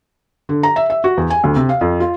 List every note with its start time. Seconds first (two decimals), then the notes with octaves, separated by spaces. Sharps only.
0.49 D3
0.63 A#5
0.76 E5
0.90 E5
1.04 F#4
1.17 E2
1.30 G#5
1.44 D2
1.56 C3
1.69 F5
1.81 F2
2.00 F4